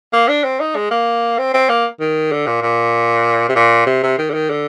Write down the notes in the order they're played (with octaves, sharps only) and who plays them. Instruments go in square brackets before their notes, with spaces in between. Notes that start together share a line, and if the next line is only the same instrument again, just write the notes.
[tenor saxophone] A#3
D4
C4
D#4
G#3
A#3
C4
C4
A#3
D#3
D3
A#2
A#2
C3
A#2
C3
C3
D#3
D3
D#3
D3